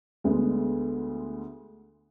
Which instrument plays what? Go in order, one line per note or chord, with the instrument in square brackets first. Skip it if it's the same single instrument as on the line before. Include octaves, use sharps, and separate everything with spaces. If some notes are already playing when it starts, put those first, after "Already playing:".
[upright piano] D2 D3 G#3 B3